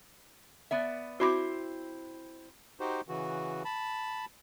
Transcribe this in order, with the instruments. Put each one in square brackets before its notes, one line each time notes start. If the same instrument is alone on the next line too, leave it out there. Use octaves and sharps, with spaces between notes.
[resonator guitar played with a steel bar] B3 D5 E5
[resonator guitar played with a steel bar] C4 E4 C5 [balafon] F#4 B5 D6
[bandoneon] D#4 F#4 G4 C5
C#3 E3 F#4
A5 B5